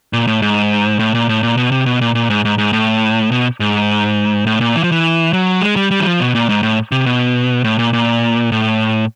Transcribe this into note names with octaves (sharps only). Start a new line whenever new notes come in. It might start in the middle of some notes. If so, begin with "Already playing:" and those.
A#2
A2
G#2
A2
A#2
A2
A#2
B2
C3
B2
A#2
A#2
G#2
G#2
G#2
A2
B2
G#2
A2
A#2
E3
F3
E3
F#3
G#3
G3
G3
E3
F3
B2
A#2
G#2
A2
C3
B2
A2
A#2
A#2
A2